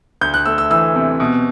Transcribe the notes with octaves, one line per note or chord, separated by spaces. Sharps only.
D2 G6
F#6
A3 E6
E6
E3 E6
C3
B2